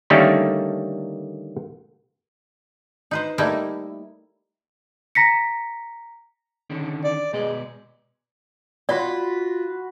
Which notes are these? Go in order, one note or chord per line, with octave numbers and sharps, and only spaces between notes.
D3 D#3 G3 A3 A#3 C#4
D#4 B4 C5
G3 A3 A#3 D#4 E4
A#5 A#6 B6 C#7
D3 D#3 C#4
D5
B2 G#3 B4 D5
F4 F#4 D5 B5 C6